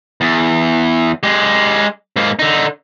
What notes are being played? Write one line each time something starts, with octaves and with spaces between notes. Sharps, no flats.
E2
G#3 G4
G#2 A#3
D3 D#4